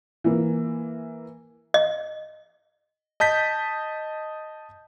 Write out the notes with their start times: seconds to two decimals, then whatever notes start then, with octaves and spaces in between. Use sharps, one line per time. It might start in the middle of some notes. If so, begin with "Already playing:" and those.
0.24 E3 A#3
1.74 D#5
3.20 D#5 A5 G6 B6